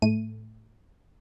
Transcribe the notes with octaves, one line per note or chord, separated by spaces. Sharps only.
A2 A3 D#7